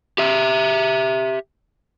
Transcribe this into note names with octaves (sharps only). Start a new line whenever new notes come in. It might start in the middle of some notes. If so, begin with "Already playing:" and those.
G4 E5